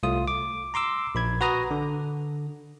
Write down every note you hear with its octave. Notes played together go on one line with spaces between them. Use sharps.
C2 A3 F4 D#6
D6
A#5 C6 D6 E6
A#1 B5 G#6
F#4 B4 A#5 D#6
D3